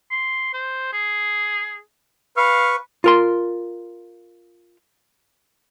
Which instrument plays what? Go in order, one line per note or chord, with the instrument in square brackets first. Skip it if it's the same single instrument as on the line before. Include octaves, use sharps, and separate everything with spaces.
[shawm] C6
C5
G#4
[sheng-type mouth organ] B4 C#6 [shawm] F5
[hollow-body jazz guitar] F4 A#4 C6